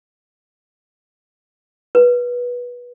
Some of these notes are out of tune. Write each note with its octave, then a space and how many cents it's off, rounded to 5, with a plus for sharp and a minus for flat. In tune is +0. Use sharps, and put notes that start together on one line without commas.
B4 -20